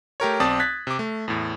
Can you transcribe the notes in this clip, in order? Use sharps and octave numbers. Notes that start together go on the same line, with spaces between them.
A3 G4 A#4 C#5
B1 C4 D5 A5 D#6
F#6 G#6 A6 B6
C3 D6
A3
E2 A2